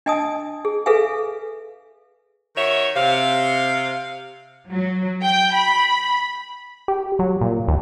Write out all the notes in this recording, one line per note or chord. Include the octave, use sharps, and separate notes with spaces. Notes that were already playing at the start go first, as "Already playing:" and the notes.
D4 D#5 G#5 A5 D#6
G#4
G#4 A4 B4 E5 F5 G#5
D#3 F#4 C#5 E5
C3 F5
F#3
G5
B5
G4
F#3
A#2
D#2